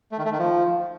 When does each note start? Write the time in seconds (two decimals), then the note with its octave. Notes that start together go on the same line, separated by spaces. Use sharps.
0.12 A3
0.18 D#3
0.25 A3
0.32 D#3
0.39 F3